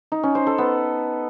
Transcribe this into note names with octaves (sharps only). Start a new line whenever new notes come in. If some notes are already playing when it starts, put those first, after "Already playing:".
D#4
C#4
C5
A4
B3